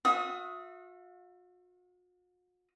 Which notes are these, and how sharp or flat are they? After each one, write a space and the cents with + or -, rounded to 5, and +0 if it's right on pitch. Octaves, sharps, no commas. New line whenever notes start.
F#4 -45 E5 +20 D#6 +20